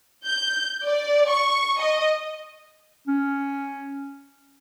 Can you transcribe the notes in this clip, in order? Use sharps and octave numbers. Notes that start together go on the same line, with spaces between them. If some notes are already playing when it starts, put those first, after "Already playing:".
G6
D5
C#6
D#5
C#4